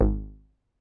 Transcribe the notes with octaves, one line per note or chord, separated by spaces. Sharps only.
G#1